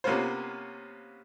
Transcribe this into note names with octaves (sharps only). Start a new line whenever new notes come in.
C3 A#3 B3 C#4 F4 C5